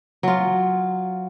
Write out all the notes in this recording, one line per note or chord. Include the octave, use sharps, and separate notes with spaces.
F#3 F4